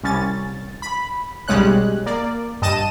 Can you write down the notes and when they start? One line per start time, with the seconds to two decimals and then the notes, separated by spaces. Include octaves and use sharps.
0.03 C2 C#4 A6
0.82 B5
1.48 B1 G3 G#3 C#4 F#6
2.06 A#3 D5
2.62 G2 D#5 A5 D#7 E7